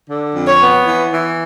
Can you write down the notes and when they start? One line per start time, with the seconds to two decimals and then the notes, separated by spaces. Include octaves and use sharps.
0.08 D3
0.35 F2
0.47 C#5
0.60 B3
0.86 E3
1.12 E3